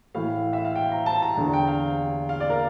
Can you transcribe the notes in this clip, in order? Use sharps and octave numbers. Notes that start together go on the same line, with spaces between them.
A2 E3 F5
E5
F5
G5
A#5
A5
A#5
E2 D3
G5
F5
F5
D5
A#4